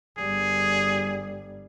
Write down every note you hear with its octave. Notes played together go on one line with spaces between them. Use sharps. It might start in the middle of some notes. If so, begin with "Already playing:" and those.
G1 G3 G#4